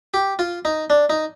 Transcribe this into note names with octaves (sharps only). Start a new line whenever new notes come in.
G4
F4
D#4
D4
D#4